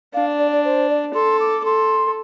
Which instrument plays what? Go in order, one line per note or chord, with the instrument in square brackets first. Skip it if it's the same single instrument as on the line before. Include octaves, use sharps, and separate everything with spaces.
[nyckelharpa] D4 [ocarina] F5
[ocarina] D5
D5
C5
D5
[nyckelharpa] A4 [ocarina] C6
[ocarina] D6
[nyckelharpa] A4 [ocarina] C6